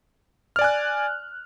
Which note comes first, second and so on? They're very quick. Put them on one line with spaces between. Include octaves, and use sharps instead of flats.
F6 D5 G#5 F#6